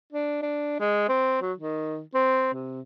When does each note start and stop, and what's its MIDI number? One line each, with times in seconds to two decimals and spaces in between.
0.13 0.42 62
0.42 0.78 62
0.80 1.07 56
1.09 1.40 60
1.41 1.53 54
1.58 2.01 51
2.15 2.52 60
2.53 2.81 48